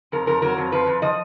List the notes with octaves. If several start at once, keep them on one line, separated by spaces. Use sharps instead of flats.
F2 A#4
F2 A#4
F#3 A#4
F2
F3 B4
F2
F3 D#5